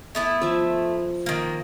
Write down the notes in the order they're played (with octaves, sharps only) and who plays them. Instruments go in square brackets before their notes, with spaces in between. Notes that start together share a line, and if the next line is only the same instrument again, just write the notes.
[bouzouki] A3 B3 E4
[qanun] F3 E5
[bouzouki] D#3 A#3